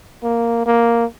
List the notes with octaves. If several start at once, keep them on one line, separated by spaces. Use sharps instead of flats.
A#3
A#3